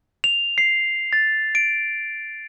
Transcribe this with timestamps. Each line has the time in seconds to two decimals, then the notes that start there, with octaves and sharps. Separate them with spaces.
0.24 F7
0.58 C7
1.13 A6
1.55 D7